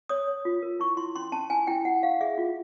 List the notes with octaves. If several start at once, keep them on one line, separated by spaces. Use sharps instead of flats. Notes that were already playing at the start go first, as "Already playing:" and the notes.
C#5 D#6
C#5
F4
A#4
E4 C#6
E4 C6
C#4 C6
C#4 A5
E4 G#5
E4 G5
E4 F#5
G4 F5
G#4 E5
F4